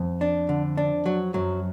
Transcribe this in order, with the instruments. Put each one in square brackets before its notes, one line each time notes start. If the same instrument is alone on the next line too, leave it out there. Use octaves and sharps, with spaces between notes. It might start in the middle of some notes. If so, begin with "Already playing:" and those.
Already playing: [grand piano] F2
[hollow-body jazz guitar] D4
D3
D4
F#3
[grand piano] F#2 [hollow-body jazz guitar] F#3